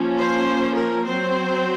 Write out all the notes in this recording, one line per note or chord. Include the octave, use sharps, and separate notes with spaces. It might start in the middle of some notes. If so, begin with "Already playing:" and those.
Already playing: F3 A#3 C#4
C5
A#4
F#3 C4 C5